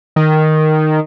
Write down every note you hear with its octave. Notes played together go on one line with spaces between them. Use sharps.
D#3